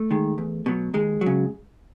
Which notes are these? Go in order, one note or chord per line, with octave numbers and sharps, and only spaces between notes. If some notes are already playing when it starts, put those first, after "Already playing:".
Already playing: A3
D#3 G#3
E2
B2 F#3
D#2 G#3
F#3
C#3